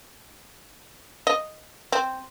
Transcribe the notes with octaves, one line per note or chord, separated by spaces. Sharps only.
D#5
C4